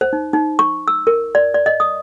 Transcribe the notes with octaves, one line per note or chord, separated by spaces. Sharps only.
C5
D#4
D#4
C#6
E6
A#4
D5
D5
D#5
D#6